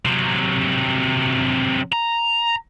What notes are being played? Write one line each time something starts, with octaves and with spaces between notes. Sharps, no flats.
C3 F#3
A#5